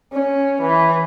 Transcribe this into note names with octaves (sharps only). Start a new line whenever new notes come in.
C#4
E3